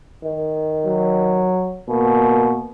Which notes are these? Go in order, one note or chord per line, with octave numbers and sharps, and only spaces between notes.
D#3
F#3
B2 A#3